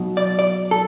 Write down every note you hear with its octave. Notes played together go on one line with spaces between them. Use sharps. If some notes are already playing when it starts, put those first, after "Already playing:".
Already playing: B1 B2 F#3
D5
D5
A4